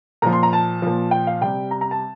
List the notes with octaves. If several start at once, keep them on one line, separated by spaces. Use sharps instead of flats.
A#2 F3 A#5
C6
A#5
A5
A#2 F3
G5
F5
C3 G3 G5
A#5
A#5
A5